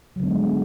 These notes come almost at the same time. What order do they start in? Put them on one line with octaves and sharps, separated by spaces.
F#3 D3 B3 G#3